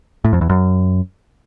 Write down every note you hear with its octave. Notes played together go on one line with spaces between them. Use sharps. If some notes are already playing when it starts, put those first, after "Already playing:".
A2
F2
E2
F#2